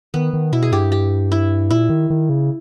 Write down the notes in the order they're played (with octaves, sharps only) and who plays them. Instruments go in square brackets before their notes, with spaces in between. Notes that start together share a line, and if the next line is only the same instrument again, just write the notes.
[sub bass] D#3 [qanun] B3
[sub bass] D#3
[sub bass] B2 [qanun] E4
[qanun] G#4
[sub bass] G2 [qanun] G4
[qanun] G4
E4
[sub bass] A#2 [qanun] E4
[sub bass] D#3
D#3
C#3